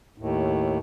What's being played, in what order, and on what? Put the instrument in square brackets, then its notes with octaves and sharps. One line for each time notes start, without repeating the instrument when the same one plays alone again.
[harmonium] D#2 A2